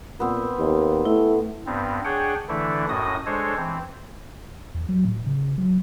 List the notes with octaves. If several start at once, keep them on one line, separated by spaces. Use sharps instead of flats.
A#2 B3 C4
D#2
A3 E4
G2 B3 C4
D4 G#4 C#5 F#5 G5
D3 E3 A3 D4 E4
F#2 A2 F#4 D#5 D#6
G#3 D4 A4 C5 C#5
E3 C4
E2
F#3
A2
C#3
F#3